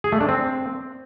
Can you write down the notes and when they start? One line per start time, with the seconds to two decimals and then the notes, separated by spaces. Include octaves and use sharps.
0.04 G#4
0.12 A3
0.20 D4
0.29 C4